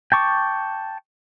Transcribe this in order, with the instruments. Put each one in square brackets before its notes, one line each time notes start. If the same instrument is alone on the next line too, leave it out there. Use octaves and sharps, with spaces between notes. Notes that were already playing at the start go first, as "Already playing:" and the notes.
[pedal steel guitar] G5 A5 C#6 D6